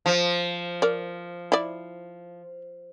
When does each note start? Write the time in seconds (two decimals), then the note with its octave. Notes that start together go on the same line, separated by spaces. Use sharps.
0.06 F3
0.82 A#4 D5
1.52 E4 D5